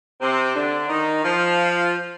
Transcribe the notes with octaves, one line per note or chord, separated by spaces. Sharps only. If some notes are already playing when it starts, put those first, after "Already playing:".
C3 C4
D3 D4
D#3 D#4
F3 F4